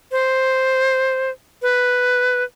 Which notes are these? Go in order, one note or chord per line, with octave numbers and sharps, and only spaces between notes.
C5
B4